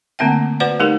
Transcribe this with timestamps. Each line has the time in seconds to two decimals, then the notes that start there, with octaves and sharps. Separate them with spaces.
0.19 D3 A3 A#3 C4 E5 G5
0.60 F#4 B4 C5 D5 F#5
0.80 G#3 A3 D#4 G4 A#4